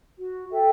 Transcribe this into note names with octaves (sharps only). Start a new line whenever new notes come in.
F#4
A4 E5 G5